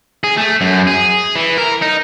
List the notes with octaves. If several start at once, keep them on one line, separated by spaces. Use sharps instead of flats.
G#4
A3
F#2
G#4
E3
A#4
D#4